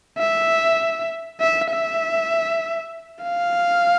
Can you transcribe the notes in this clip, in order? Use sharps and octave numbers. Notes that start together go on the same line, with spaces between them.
E5
E5
E5
F5